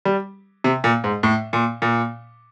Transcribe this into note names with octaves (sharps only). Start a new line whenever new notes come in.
G3
C3
A#2
G#2
A2
A#2
A#2